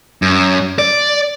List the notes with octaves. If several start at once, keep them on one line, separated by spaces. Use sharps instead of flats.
F#2
D5